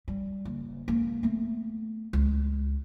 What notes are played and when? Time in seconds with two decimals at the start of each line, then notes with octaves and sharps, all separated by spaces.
0.08 G3
0.45 F#1
0.88 E1 A#3
1.23 A3 B3
2.13 C#2